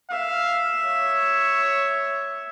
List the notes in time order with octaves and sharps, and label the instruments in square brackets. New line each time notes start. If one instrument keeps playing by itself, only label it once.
[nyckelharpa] E5 [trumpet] F5
[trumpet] C#5